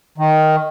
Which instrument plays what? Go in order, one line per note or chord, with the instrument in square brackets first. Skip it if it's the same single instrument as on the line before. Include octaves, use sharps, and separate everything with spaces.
[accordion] D#3